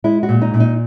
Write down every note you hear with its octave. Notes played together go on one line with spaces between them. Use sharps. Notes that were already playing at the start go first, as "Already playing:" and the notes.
G#3 E4
F#4
A#2
D#4
A#2
D#4